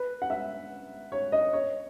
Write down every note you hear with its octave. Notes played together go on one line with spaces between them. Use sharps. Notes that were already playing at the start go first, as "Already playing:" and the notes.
Already playing: B4
F#5
E5
C#5
D#5
C#5